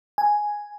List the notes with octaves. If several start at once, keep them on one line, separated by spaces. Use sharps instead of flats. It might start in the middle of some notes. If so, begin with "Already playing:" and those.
G#5